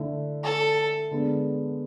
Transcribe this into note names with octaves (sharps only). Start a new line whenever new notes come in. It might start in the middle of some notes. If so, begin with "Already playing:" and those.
Already playing: D3 A3 E4
A4
D3 G#3 B3 D4